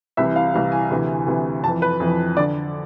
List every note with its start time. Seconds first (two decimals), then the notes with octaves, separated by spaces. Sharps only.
0.17 C2 C3 E3 E5
0.36 F5
0.54 C2 C3 E3 F5
0.72 G#5
0.90 D2 C3 E3
1.26 D2 C3 E3
1.63 F2 A5
1.68 E3
1.82 B4
2.00 F2 E3
2.37 D3 D5